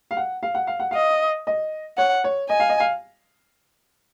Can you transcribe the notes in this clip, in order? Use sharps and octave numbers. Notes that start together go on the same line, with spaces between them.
F5
F#5
F5
F#5
F5
F#5
D#5 F5
D#5
C#5 F#5
C#5
D#5 G#5
F5
D#5
F5